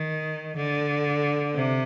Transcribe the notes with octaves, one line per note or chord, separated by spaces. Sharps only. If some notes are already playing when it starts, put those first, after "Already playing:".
Already playing: D#3
D3
C3